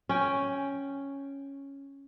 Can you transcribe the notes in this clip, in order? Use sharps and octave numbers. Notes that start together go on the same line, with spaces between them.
C#4 G5